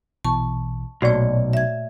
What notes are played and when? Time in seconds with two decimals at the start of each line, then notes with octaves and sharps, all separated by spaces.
0.24 A#1 B2 E3 A5 C#6
1.02 B1 A#2 A3 F#4 C#5 D5 C#6
1.53 E5 G#6